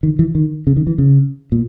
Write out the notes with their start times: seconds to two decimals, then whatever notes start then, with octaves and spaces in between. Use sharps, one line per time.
0.03 D#3
0.19 E3
0.35 D#3
0.67 C#3
0.77 D#3
0.87 E3
0.98 C#3
1.52 A#2